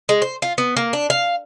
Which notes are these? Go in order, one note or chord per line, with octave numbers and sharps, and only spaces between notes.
G#3
C5
F4
B3
A#3
D4
F5